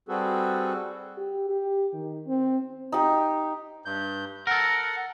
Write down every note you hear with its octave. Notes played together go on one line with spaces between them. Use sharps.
G3 C4 F#4 G#4 A4 B4
G4
G4
D#3
C4
D#4 G4
G2 G6
A4 A#4 F#5